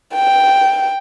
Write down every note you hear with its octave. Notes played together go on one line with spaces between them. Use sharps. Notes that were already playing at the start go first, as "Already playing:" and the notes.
G5